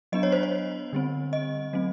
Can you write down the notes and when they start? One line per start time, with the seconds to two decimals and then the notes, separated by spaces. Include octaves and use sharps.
0.12 F#3 B3 D4 D#5
0.23 C#5
0.32 C5
0.43 C#5
0.93 D3 G3 C4
1.33 D#5
1.73 F#3 A3 C4